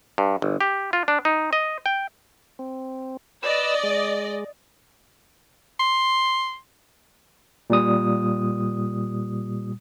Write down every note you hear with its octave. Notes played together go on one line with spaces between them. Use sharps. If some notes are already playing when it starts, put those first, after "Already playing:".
G2
G1
G4
F4
D4
D#4
D#5
G5
C4
B4 D5 D#5 E6
G#3
C6
A#2 G3 D#6